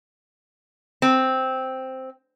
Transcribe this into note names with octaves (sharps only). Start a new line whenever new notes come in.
C4